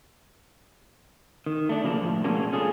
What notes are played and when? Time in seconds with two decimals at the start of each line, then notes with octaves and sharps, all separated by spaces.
1.46 D#3
1.69 A3 D4
1.83 C#3 F3 A#3 D4
2.02 A2 F3
2.24 B2 G#3 A#3 C#4 D4
2.53 C#4 F4 G#4 A4